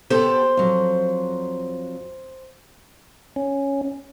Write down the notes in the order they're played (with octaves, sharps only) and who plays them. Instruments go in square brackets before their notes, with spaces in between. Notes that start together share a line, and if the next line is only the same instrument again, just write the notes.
[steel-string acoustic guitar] B3 G4 A4 [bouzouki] C5
[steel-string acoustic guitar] F2 F#3
[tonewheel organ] C#4